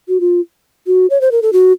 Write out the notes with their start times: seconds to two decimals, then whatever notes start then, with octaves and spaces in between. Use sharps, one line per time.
0.08 F#4
0.20 F4
0.87 F#4
1.10 C#5
1.21 C5
1.32 A#4
1.42 A4
1.53 F#4